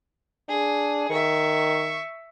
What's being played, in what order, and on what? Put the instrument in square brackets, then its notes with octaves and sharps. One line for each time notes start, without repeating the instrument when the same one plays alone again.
[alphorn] D4 [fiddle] G#4
[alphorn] D#3 [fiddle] E5 C#6